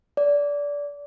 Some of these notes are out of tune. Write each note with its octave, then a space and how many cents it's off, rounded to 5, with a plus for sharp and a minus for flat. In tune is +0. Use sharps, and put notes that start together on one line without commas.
D5 -20